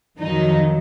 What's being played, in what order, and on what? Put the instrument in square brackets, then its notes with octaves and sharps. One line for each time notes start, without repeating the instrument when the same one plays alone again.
[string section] F2 D#3 F#3 D#4